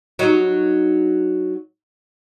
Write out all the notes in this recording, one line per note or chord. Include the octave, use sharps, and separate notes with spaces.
F#3 D#4